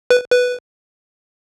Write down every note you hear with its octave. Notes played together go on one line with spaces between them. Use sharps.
B4
B4